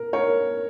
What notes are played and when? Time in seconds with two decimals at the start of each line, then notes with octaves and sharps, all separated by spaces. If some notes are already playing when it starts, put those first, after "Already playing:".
Already playing: A#4
0.13 A#4 C#5